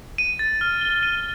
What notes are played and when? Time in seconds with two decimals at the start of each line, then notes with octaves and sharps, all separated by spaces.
0.18 D#7
0.39 A6
0.61 F6
0.81 G7
1.03 D#7